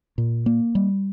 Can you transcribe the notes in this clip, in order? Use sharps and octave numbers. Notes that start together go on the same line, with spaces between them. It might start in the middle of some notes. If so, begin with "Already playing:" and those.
A#2
A#3
G3